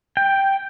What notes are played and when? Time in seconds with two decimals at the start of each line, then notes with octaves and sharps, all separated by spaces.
0.17 G5